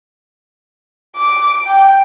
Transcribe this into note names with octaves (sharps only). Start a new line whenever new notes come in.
D6
G5